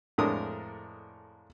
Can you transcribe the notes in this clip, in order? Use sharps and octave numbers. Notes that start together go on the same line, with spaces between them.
F2 A2 G#3 D4 A#4 D#6